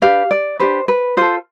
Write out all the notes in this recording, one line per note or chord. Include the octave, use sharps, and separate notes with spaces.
D4 G4 B4 F5
D5
D4 G4 B4 C5
B4
F4 A4 C5